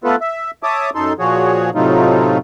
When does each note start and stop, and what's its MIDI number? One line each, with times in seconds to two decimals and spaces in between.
0.04 0.16 57
0.04 0.16 59
0.04 0.16 65
0.04 0.16 69
0.04 0.16 71
0.21 0.51 76
0.63 0.90 73
0.63 0.90 76
0.63 0.90 81
0.63 0.90 86
0.63 0.90 87
0.95 1.13 42
0.95 1.13 63
0.95 1.13 69
0.95 1.13 84
1.19 1.70 46
1.19 1.70 53
1.19 1.70 66
1.19 1.70 68
1.19 1.70 73
1.75 2.38 45
1.75 2.38 48
1.75 2.38 54
1.75 2.38 57
1.75 2.38 63
1.75 2.38 65